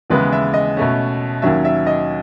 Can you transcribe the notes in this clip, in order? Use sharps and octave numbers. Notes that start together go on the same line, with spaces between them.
D#2 C#3 E3 G#3 B3 B4
E5
D#5
B2 A3 C#4
D#2 D#3 F#3 C#4 E5
E5
D#5